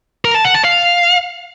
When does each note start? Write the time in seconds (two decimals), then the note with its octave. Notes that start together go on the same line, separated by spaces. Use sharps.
0.25 A#4
0.35 A5
0.45 F#5
0.55 A5
0.65 F5